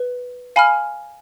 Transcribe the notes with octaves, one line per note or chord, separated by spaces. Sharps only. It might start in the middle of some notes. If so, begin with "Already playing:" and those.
Already playing: B4
F5 G#5 B5 F6